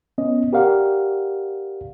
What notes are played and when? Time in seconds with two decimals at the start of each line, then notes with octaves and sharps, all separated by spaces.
0.18 B3 C#4 D#5
0.53 G4 A#4 D5 F5 F#5